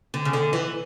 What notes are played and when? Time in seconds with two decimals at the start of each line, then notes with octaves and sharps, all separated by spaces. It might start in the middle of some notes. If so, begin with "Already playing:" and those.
0.14 D3
0.25 C#3
0.33 D3
0.53 E3